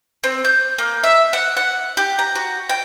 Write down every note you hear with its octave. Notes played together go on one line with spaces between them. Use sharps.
C4
G6
A#3
E5
F#5
F#5
G4
A#5
F#4
G5